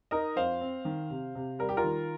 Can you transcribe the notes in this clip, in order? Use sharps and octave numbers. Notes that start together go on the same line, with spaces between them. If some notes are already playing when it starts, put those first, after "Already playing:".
D#4 A#4 D#5
F2 C5 F5
C4
D#3
C3
C3
G3 A#4
G4
F4 A#4
D#3